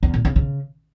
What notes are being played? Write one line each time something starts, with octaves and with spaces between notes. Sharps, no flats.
E2
A#2
C#3
C#3